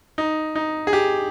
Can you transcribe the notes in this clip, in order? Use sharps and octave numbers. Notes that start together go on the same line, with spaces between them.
D#4
D#4
G#4
G4